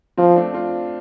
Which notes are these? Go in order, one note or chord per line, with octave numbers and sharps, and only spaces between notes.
F3 C4 F4
A3 D4
C4 F4